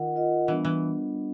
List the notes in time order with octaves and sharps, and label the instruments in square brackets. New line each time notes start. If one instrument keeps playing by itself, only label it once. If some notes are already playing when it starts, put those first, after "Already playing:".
Already playing: [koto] D#3 [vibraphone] F4 A#4 D#5 F#5
[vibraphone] F4 A#4 D#5 F#5
[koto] E3 [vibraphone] G3 B3 D4
[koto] E3